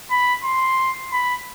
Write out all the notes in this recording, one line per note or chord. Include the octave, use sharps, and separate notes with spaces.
B5
C6
B5